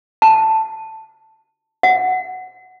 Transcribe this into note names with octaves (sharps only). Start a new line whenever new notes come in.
A5
F#5